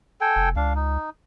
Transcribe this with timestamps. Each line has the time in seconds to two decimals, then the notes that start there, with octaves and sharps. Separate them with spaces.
0.21 A4 G5 G#5
0.36 F1
0.56 C#2 D4 F5
0.76 D#4